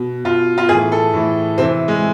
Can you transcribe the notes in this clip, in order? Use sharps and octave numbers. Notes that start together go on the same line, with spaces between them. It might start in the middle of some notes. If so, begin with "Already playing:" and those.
Already playing: B2
B2 F4
F4
A2 E3 G#4
A4
A2 E3
C3 E3 C4
G#3